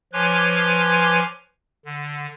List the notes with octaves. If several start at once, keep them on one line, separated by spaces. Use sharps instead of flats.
F3 B4 C#5 G#5 C6 D6
D3